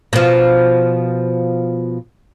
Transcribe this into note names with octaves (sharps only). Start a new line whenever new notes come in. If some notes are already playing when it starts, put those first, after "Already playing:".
B2 F3